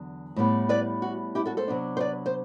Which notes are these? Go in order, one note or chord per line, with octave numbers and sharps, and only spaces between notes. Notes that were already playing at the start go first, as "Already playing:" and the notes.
Already playing: E2 D3 F#3
A2 G3 B3
B4 D5
F#4
E4 G4
F#4 A4
A4 C5
C3 F#3 B3 D4
C5
B4 D5
C5